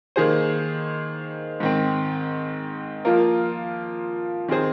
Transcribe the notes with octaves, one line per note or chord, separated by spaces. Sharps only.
D#3 A#3 G#4 C5
G#2 D#3 C4
F3 A#3 F4 A#4
D#3 C4 G#4 C5